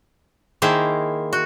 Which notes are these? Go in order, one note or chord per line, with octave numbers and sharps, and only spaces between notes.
D#3 A#3 E4 G#4 C5
F#4